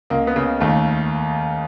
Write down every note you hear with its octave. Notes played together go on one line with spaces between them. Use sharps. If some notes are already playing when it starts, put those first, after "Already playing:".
C#2 A#3
B3
C#3
D#2 A3